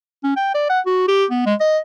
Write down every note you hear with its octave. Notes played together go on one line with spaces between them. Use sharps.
C#4
G5
D5
F#5
F#4
G4
B3
G#3
D#5